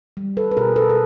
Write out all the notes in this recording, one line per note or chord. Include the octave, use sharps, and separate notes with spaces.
G3
A4 B4
B4
B2 G#4 A#4
A4 B4
A4